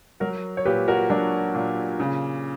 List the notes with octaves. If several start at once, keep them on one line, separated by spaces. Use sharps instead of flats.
F#3 F#4 A#4
C#5
A#2 G4 B4
F#4 A#4
F#3 D4 F#4
A#2
C#3